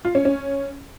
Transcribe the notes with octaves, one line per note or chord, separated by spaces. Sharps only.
F4
C#4
C#4